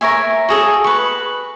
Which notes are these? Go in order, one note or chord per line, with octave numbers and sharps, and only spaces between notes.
A#4 C#5 E5 G#5
F#4 G#4 A4
B4 C#6